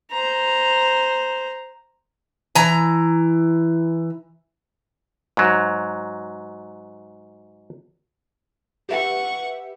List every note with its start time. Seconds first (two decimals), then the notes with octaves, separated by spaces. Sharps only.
0.11 C5 A#5
2.55 E3 A#5
5.37 G#2 F#3
8.89 G4 B4 E5 F#5 C#6